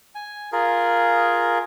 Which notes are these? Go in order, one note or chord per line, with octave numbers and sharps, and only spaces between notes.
G#5
F4 G#4 A#4